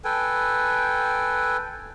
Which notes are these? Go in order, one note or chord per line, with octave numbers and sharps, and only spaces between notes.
A4 B4 G5 G#5